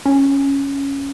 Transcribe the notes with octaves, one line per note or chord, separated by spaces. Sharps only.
C#4